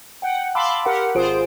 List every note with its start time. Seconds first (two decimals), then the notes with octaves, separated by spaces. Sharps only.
0.22 F#5 G5
0.55 F5 A5 B5 C6 D6 E6
0.86 G4 A#4 F#5
1.15 G#1 F4 G#4 C5 D7